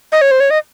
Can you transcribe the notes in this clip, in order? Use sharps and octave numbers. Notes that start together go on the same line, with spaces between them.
D#5
C#5
C5
C#5
D#5